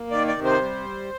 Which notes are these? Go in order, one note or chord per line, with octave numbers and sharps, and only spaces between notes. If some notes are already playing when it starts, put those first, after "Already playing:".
Already playing: A#3
D#3 D5
D5
C3
C5
G3